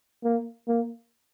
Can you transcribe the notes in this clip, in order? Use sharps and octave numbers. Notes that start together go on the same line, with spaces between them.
A#3
A#3